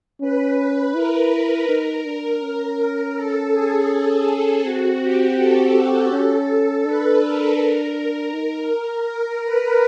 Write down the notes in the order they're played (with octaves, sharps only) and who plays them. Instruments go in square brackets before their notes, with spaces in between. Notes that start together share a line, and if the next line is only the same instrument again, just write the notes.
[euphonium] C#4 [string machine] B4
[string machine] B4
[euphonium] E4 [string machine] A#4
[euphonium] D#4
D4
C#4
[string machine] A4
G#4
[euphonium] C4 [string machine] F#4
[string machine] G4
A4
[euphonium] C#4
[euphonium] D4 [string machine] B4
[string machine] A#4
[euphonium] D#4
[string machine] A#4
B4